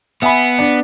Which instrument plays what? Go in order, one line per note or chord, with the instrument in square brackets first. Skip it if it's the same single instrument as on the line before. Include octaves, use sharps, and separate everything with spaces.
[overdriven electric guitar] B3 [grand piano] E5 G#5 B5
[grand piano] D4